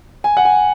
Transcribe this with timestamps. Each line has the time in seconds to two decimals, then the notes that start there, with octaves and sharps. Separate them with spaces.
0.24 G#5
0.37 F#5
0.45 G#5